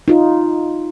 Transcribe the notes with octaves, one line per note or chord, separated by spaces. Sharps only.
D#4 F4